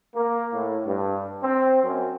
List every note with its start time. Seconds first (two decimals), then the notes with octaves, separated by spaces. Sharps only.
0.15 A#3
0.53 A2
0.86 G2
1.43 C4
1.84 F#2